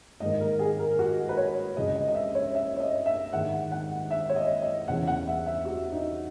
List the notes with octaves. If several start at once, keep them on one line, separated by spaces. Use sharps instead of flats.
G#2 D#3 A#3 D#5
A#4
G#4
A#4
F#4
B4
C#5
C#2 C#3 G#3 D#5
D#5
D#5
E5
C#5
E5
C#5
D#5
E5
G#2 D#3 G#3 F#5
F#5
E5
C#5
D#5
D#5
E2 C#3 E3 F#5
F#5
E5
E5
F#4
D#4